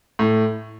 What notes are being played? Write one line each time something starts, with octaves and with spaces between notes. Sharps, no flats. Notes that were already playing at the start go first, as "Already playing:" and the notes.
A2